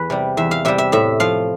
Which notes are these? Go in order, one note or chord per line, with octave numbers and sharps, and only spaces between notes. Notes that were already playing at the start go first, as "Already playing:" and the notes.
Already playing: E2 B4
C3 G3
E2 E5
F5
C3 G3 E5
E5
A2 E5
F3 F5